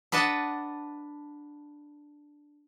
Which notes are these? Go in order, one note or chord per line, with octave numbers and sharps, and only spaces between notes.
D4 B4 D#5 F#5 A5